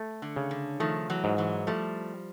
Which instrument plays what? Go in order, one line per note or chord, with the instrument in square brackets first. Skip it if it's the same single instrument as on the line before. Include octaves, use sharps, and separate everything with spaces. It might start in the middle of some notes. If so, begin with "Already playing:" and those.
Already playing: [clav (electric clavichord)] A3
[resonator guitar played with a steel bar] D3
[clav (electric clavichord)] C#3
[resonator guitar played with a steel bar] D3
[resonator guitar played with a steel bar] D#3 F3 [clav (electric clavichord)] A3
[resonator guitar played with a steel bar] E3 F#3
[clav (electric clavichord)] G#2
[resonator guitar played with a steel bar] E3 F#3
[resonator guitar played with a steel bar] F3 G3 [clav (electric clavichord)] A3